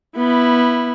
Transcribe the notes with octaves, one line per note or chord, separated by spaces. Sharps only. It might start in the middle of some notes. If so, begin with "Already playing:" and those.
B3 E4